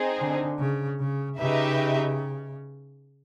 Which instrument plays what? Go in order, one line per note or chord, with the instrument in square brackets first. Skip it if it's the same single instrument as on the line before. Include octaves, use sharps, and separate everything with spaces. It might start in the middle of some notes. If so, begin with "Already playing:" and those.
Already playing: [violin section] C4 D#4 G#4
[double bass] D3
C#3
C#3
[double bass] C#3 [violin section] D#4 G4 B4 E5